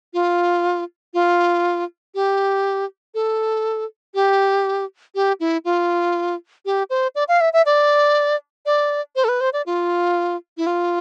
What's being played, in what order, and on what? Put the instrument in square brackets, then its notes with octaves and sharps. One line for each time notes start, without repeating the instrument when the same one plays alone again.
[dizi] F4
F4
G4
A4
G4
G4
E4
F4
G4
C5
D5
F5
E5
E5
D5
D5
C5
A4
B4
C5
D5
F4
E4
F4